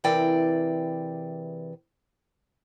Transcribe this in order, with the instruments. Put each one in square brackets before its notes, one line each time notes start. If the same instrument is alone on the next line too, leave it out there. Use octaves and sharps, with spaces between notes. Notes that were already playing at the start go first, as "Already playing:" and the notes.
[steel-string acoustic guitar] C3 E3 G#4 A#4 D5 G5